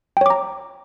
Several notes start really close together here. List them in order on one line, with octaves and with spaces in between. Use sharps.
G5 C#5 D6 A#5